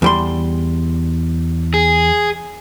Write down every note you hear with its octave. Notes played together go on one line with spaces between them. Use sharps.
E2 G3 C6
G#4